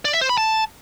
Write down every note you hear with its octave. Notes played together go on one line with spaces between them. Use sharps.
D5
E5
C5
B5
A5